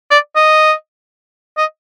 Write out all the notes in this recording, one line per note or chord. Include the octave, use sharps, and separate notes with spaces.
D5
D#5
D#5